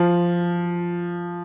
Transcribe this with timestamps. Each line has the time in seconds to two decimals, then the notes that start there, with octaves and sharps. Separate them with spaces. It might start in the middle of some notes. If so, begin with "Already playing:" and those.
Already playing: F3